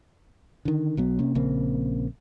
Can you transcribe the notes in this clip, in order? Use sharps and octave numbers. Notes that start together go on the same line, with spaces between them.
D3 D#3
B1 F#3 B3
C3 A#3 C#4
A#1 C#3 A#3 C4